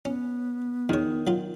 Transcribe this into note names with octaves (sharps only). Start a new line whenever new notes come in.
B3 C#4
E2 D#3 C#5
F#3 F4